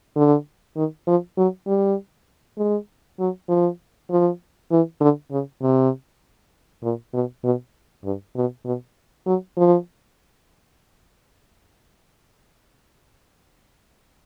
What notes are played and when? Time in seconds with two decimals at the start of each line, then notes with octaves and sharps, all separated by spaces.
0.16 D3
0.76 D#3
1.07 F3
1.38 F#3
1.67 G3
2.58 G#3
3.20 F#3
3.49 F3
4.11 F3
4.72 E3
5.01 D3
5.31 C#3
5.62 C3
6.83 A#2
7.14 B2
7.44 B2
8.04 G2
8.36 B2
8.65 B2
9.26 F#3
9.57 F3